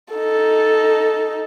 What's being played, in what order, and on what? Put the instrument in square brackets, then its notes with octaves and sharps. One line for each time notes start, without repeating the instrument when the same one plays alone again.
[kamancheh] D#4 A4